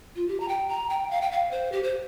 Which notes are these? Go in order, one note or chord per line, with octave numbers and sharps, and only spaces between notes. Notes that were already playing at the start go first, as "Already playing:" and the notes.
F4
G4
A#5
G5
A#5
G5
F5
G5
F5
C5
G4
C5